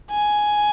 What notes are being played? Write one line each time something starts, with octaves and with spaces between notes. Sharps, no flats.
G#5